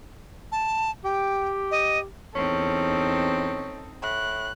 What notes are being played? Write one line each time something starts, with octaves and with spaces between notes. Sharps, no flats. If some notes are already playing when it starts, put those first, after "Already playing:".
A5
G4 G5
D#5
E2 C4 C#4 D#4 A4
A2 F#6